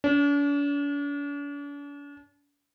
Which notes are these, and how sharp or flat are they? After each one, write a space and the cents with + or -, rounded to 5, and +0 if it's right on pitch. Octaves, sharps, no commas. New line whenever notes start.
D4 -45